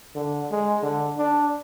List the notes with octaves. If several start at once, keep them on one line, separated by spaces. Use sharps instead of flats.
D3
G#3
D3
D4